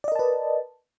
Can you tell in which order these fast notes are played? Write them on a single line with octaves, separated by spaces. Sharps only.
D5 D#5 A#4 A5 B4